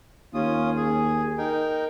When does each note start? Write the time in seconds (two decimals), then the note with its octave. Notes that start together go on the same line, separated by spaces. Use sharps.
0.34 D#2 C#4 F4 D#6
0.76 G#4
1.38 D#4 A#4 G5